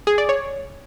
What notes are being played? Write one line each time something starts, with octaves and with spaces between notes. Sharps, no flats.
G#4
D5
C#5